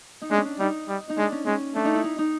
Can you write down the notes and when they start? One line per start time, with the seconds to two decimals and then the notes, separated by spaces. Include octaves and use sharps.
0.22 D#4
0.30 G#3 D4
0.38 C#4
0.45 D4
0.59 G3 D#4
0.88 G3
1.10 D#4
1.17 G#3 D4
1.32 C#4
1.46 G#3 C#4
1.75 A3 D4
1.85 D#4
1.95 E4
2.04 D#4
2.18 D#4